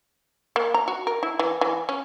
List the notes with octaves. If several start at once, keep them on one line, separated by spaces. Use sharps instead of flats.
A#3
A#5
F#4
A#4
E4
E3
E3
C#4